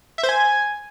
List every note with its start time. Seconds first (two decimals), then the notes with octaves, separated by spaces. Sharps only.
0.18 E5
0.23 C5
0.29 G#5